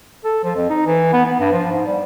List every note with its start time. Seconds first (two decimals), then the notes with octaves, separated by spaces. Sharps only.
0.25 A4
0.44 F3
0.56 F2
0.70 D#4
0.86 E3
1.13 B3
1.25 B3
1.40 G2
1.52 F3
1.72 G#2
1.86 G3